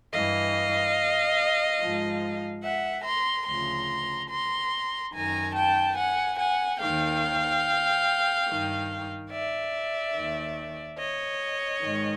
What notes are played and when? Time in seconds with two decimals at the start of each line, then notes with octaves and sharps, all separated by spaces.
0.13 G2 E3 D#5 F5
1.80 G#2 F3
2.63 E5 F#5
3.05 A#5 C6
3.47 D2 C#3 F3 A#5 C6
4.30 A#5 C6
5.13 F#2 D#3 G#5 A#5
5.56 G5 A5
5.97 F#5 G#5
6.39 F#5 G#5
6.81 D#2 D#3 F5 G5
8.48 G2 D#3
9.31 D5 E5
10.14 D#2 D#3
10.98 C#5 D#5
11.81 G#2 D#3